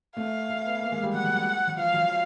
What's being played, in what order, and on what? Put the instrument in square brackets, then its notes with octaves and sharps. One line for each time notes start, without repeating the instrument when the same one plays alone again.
[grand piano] A3 [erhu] F5
[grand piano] A3
B3
A#3
G#3
G3
[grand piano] F#3 [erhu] F#5
[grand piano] F#3
F#3
F#3
[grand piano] F3 [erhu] F5
[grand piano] F#3